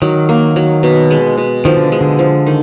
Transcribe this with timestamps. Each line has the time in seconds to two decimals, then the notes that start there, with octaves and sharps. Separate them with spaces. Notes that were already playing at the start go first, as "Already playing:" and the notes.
0.02 D#3 F#3
0.29 A#3
0.56 F#3
0.83 B2
1.10 G#3
1.38 B2
1.65 D#3 F3
1.77 D3
1.92 G#3
2.01 D3
2.19 F3
2.47 D#3